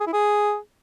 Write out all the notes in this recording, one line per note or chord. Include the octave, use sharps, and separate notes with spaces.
G#4
E4
G#4